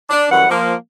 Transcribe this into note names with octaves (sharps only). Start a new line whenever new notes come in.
D4
F#2 E3 G3 F#5
F3 A#3